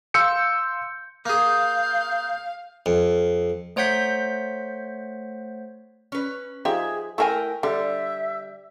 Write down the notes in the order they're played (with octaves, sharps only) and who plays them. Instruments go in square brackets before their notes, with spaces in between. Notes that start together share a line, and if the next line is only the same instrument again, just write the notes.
[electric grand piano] F5 C6 E6 G6 C#7
[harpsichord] A#3 G#4 [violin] F5 [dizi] G6
[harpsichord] F2
[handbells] A3 C5 C#5 F#5 G6 B6
[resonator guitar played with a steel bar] C#4 B4
[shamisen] F3 D#4 G4 [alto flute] G#4 [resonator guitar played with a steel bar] E5
[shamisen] A3 A4 G#5 [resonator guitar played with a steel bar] E4 A#4 [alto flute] G5
[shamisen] D3 [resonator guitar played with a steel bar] G3 [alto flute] E5